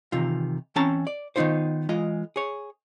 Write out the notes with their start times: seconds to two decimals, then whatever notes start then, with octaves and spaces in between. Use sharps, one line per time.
0.12 C3 D#3 E3 F4
0.76 E3 C4 C#4 A5 A#5
1.07 D5
1.36 D#3 B3 C4 D#4 F4 C5
1.89 E3 G#3 F4 D#5
2.36 G#4 C#5